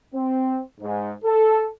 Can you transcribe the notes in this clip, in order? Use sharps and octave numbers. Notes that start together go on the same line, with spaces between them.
C4
G#2
A4